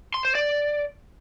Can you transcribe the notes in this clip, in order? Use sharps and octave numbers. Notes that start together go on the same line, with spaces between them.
C6
C5
D5